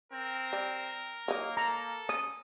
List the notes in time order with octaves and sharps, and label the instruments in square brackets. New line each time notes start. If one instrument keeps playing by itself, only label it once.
[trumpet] C4 [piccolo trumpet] A#4
[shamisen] G3
[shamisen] F#3 D#4 [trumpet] A#3
[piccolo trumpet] A4 [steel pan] A#5
[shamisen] C#4 [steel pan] D#6